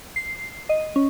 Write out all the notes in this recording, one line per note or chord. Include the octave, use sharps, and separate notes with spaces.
C7
D#5
C#4